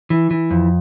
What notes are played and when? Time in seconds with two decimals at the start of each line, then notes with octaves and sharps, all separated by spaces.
0.10 E3
0.31 E3
0.51 F2